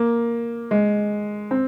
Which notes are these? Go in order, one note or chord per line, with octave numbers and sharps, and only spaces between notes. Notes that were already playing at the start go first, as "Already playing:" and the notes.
Already playing: A#3
G#3
C4